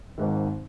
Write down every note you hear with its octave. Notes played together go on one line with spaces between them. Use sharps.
G#1 G#2 D#3